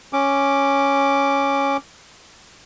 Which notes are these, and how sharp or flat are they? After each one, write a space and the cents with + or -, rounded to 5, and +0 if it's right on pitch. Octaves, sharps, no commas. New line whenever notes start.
C#4 +0 D6 +0